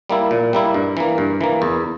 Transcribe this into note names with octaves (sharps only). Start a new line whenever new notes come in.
G3 A#3 E4
A#2
G3 A#3 E4
G2
E3 A#3
G2
E3 A#3
E2